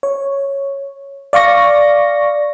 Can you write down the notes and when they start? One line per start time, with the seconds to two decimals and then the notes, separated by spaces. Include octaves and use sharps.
0.03 C#5
1.33 D5 F5 C#6 A#6